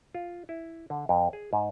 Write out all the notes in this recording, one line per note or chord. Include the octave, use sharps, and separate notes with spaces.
F4
E4
D3
F2
G#4
G#2